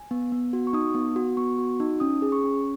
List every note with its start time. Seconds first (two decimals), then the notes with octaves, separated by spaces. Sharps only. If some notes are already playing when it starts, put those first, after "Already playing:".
Already playing: G#5
0.11 B3
0.32 B3
0.53 F#4
0.67 C#6
0.73 D#4 D#6
0.95 B3
1.16 F#4
1.37 B3 C#6
1.58 F#4
1.80 D#4
2.00 C#4 D#6
2.22 G#4
2.32 C#6
2.43 C#4